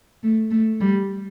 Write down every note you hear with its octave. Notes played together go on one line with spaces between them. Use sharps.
A3
A3
G3